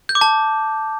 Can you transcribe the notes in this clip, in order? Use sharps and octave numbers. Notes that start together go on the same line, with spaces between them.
G6
D6
A5